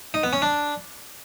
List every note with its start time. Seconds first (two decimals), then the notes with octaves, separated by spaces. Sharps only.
0.14 D#4
0.23 B3
0.33 C#4
0.42 D4